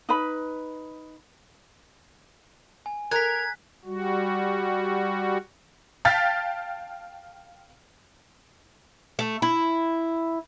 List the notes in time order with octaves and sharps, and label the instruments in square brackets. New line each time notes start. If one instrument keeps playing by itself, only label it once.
[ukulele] D#4 B4 B5
[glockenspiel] G#5
[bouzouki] A#4 [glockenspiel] F#6 B6 [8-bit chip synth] G#6
[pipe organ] G3 F#4
[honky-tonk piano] F5 G5 A5 F6 A6 B6
[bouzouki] A3
E4